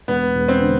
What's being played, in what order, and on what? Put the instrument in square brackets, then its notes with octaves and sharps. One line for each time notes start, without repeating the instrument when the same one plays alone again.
[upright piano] E1 [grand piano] B3
[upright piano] E1
[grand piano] C4
[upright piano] D3